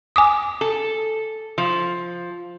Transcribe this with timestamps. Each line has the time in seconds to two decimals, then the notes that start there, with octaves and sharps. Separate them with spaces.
0.16 G#5 D6 D#6
0.61 A4
1.58 F3